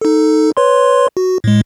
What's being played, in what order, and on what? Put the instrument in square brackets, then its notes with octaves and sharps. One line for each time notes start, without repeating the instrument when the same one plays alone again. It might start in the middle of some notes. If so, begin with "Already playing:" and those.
[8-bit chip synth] D#4 A4
B4 C#5 C6
F#4
A2 G#3